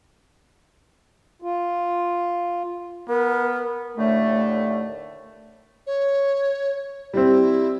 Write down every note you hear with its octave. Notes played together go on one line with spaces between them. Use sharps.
F4
B3 A#4
D#2 A2 D3 A3
C#5
G3 C4 E4